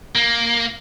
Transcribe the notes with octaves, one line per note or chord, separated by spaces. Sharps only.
A#3